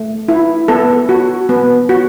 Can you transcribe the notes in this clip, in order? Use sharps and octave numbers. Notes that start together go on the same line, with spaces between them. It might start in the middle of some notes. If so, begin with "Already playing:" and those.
Already playing: A3
E4
B3 A4
F#4
B3
F#4